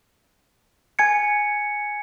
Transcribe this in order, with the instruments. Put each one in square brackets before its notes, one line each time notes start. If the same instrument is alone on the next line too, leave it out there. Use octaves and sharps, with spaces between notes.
[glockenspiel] G#5 G#6 C#7